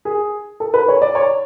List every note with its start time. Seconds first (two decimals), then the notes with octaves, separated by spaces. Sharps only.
0.05 G#4
0.60 A4
0.74 B4
0.88 C#5
1.02 D5
1.15 C#5